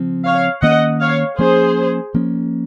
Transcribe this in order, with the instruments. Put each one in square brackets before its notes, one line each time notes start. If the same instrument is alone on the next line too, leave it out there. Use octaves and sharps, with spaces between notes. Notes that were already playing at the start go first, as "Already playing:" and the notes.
Already playing: [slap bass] C#3 F3 C4
[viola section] C#5 F5
[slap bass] D#3 A#3 C#4 [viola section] D#5 F#5
[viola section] C#5 F5
[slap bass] F3 A#3 C#4 [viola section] G#4 C5
[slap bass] F3 A#3 C#4